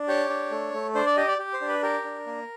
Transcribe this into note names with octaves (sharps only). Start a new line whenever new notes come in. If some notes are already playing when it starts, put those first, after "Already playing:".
Already playing: D4
G4 C#5
D4
A3
A3
D4 C5
D5
G4 D#5
D5
G4
C5
D4
B4
G4 A#4
D4
A#3